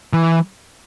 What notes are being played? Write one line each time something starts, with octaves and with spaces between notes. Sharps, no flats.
E3